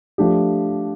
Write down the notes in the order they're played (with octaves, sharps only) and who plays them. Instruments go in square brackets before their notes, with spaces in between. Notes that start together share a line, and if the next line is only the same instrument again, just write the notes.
[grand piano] F3 A3 D4 G4